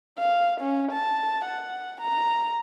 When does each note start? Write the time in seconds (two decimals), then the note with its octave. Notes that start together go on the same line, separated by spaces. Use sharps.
0.19 F5
0.60 C#4
0.91 A5
1.45 F#5
2.01 A#5